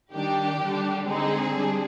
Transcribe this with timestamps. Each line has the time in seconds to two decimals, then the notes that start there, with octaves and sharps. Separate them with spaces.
0.13 D#3 G3 D4 G4
0.61 D3 G3 D4
1.07 D3 G#3 C4 D#4 G#4
1.54 G3 D4